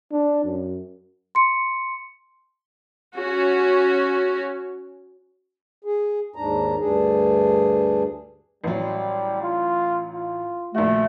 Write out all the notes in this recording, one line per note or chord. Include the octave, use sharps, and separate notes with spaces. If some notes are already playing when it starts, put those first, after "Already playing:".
D4
F#2
C6 C#7
C#4 F#4
G#4
D#2 G#2 D4 A#5
D2 G2 D4 G#4
A1 F#3 G3
F4
F4
A#1 D#3 A3 F#4